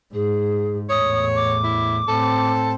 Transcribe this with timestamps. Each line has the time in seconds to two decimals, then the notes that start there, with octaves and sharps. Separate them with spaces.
0.14 G#2 G#4
0.90 E2 A2 C#5 D#6
1.35 D6
1.64 E4
2.08 A2 C4 A4